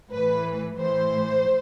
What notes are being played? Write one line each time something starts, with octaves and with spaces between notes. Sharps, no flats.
A2 E3 B4
A2 E3 C5